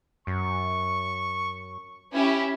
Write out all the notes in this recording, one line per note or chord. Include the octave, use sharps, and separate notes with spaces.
F#2 C#6
C#4 E4 G4